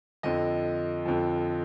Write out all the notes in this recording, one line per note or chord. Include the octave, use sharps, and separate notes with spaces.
F2 D3 F3 D#5
F2 D3 F3